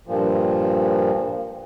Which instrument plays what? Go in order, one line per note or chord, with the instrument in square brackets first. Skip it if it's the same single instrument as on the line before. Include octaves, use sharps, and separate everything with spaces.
[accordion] G2 A#2 F3